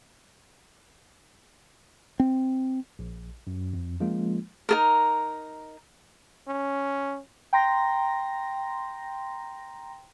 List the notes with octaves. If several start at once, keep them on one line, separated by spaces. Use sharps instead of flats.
C4
A#1
F#2
F2
F3 G#3 A#3 C#4 F4
D#4 A4 A#4
C#4
G5 A#5 C6 A#6